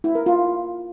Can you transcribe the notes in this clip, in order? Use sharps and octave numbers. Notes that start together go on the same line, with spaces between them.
E4
A#4
F4